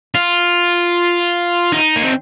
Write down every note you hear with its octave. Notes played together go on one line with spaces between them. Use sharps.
F4
D#4
A#3
C4